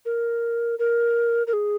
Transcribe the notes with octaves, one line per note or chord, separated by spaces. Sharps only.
A#4
A#4
A#4
G#4